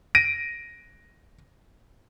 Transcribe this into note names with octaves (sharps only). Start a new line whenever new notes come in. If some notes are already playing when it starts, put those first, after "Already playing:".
A#6 D7 D#7